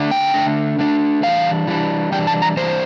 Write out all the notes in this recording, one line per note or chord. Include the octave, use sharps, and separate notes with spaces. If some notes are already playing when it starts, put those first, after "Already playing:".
Already playing: D3 A3 D4
G5
D3 A3 D4
D3 A3 D4
E3 G3 D4 F5
E3 G3 D4
E3 G3 D4 G5
A5
A#5
E3 G3 D4 C5